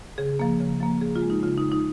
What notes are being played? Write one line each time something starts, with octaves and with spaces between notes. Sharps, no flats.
C#3 G#4
F3 A#3
C#3
F3 A#3
C#3 G#4
F4
G#3
D#4
C#3 F4
D#4
G#3
D#4